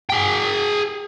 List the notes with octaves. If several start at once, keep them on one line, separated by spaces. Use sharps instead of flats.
G#4 G5